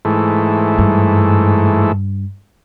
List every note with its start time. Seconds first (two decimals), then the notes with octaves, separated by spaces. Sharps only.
0.05 G#2 E3 A3
0.78 G2